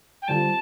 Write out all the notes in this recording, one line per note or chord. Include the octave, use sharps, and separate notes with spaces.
G5
D3 G3 C4 F4 A5